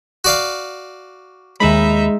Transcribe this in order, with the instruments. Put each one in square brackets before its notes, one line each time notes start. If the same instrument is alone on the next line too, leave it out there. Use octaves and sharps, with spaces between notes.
[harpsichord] F#4 D5 F5
[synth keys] D#2 B5 [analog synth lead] G#3 [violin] D#4 E5